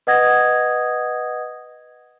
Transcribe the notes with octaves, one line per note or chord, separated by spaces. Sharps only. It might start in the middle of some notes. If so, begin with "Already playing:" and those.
B4 D#5 F#5 D#6 G#6 A#6